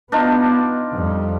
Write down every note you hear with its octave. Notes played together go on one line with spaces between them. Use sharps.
B3 D4 D#4 F4
F2 G3